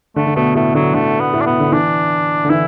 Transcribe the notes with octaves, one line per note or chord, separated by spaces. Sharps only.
D3 A3
D3
B2 A3
A2 A3
D3 F#3
D3 A3
B3
A2
D4
B2 B3
D3
E3 D4
D3
E3 E4